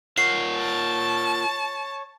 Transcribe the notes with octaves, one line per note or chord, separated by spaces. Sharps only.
F4 A#4 C#5 F#5 C7
A5